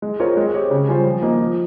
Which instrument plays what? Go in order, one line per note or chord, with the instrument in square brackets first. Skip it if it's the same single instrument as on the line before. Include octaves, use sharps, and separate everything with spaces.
[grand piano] G#3
C4 F4 A#4 C#5
G#3
C4 G4 C#5
C#3
G3 C#4 F4 C5
F3
A#3 D#4
F3